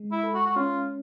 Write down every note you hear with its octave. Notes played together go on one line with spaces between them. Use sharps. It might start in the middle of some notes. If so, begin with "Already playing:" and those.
Already playing: G#3
E4
A4
F#4
F#4
C#4 F4